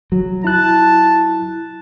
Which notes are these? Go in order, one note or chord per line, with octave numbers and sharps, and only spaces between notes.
F#3
E4 A5 F#6